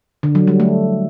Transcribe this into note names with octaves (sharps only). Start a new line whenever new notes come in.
D3
F#3
G3
A3